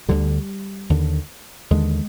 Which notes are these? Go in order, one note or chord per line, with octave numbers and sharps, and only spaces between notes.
D2 D3 G3
D#2 D3
D#2 D3 G#3